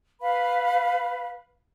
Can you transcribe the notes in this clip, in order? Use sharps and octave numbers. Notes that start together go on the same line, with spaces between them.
B4 F5 B5